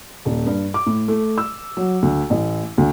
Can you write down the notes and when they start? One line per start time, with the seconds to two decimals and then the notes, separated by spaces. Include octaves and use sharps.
0.25 D#1
0.46 G2
0.74 D6
0.86 A2
1.08 A3
1.38 E6
1.77 F#3
2.02 D2
2.30 A1
2.78 D2